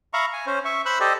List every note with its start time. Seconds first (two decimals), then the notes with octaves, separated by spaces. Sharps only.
0.13 E5 F5 A#5 B5 C#6
0.33 G#5
0.47 C#4 C5
0.65 E5 C#6
0.86 C5 B5 E6 F#6
1.00 G4 A4 C5 D5 D#5